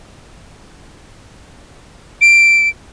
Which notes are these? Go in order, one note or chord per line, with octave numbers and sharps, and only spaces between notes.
D7